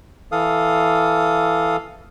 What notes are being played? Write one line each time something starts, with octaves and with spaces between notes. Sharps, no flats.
E3 A4 F5 D#6